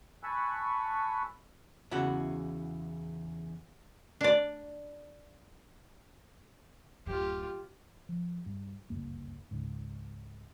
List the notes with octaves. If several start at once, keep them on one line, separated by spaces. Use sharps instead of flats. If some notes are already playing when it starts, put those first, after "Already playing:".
G#5 A5 B5 C#6 E6 F#6
E2 C#3 E4 F#4 F#5
D4 D5
D1 F#2 F4 G4
F3
G2
G1 C#2 F#2 A#3
C#2 G#2